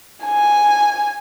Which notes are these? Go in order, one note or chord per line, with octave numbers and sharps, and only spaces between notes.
G#5